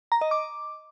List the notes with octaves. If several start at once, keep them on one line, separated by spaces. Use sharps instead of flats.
A#5
D#5
D6